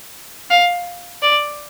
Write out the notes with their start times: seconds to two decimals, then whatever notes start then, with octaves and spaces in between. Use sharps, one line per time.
0.50 F5
1.22 D5